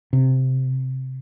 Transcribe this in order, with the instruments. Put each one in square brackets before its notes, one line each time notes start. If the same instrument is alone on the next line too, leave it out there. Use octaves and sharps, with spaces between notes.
[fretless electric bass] C3